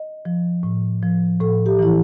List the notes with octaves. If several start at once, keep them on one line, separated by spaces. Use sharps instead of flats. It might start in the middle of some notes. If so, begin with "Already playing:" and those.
Already playing: D#5
F3
A2
F3
A2 A4
G4
E3 E4